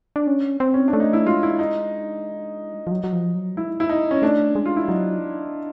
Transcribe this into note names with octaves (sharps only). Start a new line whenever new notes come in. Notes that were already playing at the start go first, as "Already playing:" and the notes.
D4
C#4
C4
C#4
D4
A3
D#4
E4
G#3 F4
E4
D#4
F3
F#3
F#3
F3
F#3
G#3 E4
E4
D#4
C#4
A3 D4
G#3
F4
E4
F#3 D#4